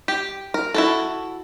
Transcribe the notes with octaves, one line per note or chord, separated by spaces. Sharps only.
G4
A#4
E4 F#4 A4